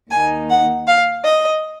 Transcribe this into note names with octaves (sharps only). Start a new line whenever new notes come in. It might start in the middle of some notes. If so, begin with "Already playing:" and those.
D#2 D#3 A#3 D#4 G#5
F#5
F5
D#5